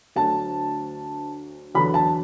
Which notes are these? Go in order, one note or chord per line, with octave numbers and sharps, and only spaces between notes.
D2 D3 F#3 A5
E2 D3 F#3 B5
A5